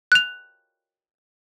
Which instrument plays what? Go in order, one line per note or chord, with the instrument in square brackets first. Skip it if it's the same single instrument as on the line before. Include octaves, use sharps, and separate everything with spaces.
[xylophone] F#6 F7